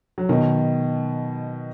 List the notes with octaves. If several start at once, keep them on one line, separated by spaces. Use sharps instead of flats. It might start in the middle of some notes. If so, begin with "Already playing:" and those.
F#3
B2 D#3